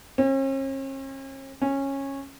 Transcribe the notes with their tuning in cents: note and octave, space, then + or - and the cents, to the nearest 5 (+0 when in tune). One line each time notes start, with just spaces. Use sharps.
C#4 -45
C#4 -15